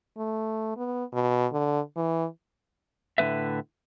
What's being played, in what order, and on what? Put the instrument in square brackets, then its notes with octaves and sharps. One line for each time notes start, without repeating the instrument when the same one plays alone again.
[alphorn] A3
B3
B2
D3
E3
[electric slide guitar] A2 D3 B3 B4 E5